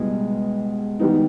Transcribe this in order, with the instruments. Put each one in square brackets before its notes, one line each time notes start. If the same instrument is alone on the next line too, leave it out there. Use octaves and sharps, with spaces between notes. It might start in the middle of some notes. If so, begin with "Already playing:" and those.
Already playing: [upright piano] C#2 B2 G3 B3 E4 [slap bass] G#3
[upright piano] D#3 G3 B3 D#4